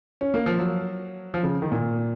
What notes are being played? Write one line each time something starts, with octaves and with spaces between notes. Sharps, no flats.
C#4
A#3
F3
F#3
F3
C#3
D#3
A#2